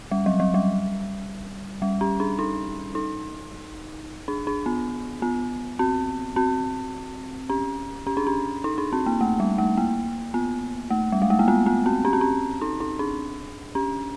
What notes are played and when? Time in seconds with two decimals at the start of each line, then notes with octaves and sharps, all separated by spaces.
0.11 G3
0.26 F#3
0.40 F#3
0.54 G3
1.82 G3
2.01 C#4
2.20 D4
2.39 D#4
2.95 D#4
4.28 D4
4.47 D4
4.66 B3
5.22 B3
5.79 C4
6.36 C4
7.50 C#4
8.07 C#4
8.17 D4
8.27 C#4
8.64 D#4
8.78 D4
8.93 C4
9.06 A#3
9.21 A3
9.40 G3
9.58 A3
9.77 A#3
10.34 B3
10.90 A3
11.12 G3
11.22 G#3
11.30 A3
11.39 A#3
11.48 B3
11.66 B3
11.86 C4
12.05 C#4
12.13 C4
12.21 C#4
12.61 D#4
12.80 D#4
12.99 D4
13.75 C#4